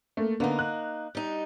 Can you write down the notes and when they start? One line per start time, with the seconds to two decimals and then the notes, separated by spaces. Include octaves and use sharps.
0.17 A3 A#3
0.40 D3 A#3 B3 D#4
0.59 F#6
1.15 G3 D#4